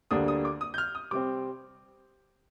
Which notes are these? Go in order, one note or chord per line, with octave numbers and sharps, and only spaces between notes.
D2 D3 G3 A#3 D4 D#6
D#6
D6
D#6
G6
F6
D#6
C3 G3 C4 D6